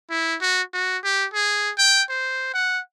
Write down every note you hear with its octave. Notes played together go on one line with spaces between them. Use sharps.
E4
F#4
F#4
G4
G#4
G5
C5
F#5